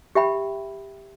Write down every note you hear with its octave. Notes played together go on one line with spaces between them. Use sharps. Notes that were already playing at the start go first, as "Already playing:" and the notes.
G4 E5 G5 B5